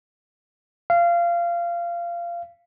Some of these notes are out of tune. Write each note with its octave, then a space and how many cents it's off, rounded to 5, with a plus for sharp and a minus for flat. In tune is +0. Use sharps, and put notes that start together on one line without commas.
F5 -20